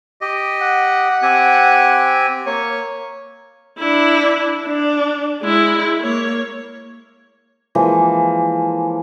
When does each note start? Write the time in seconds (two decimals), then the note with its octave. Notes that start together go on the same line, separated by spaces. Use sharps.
0.21 G4 D#5
0.61 F#5
1.22 C4 G4 G#5
2.46 A#3 C#5
3.78 D4 E4
4.64 D4
5.42 G#3 E4
6.01 A#3 C#5
7.75 E3 F3 G#3 A#3